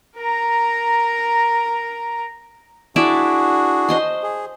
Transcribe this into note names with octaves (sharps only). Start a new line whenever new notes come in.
A#4 A#5
D4 E4 F#4 G#4 D5 E5
C5 D#5 C6
G#4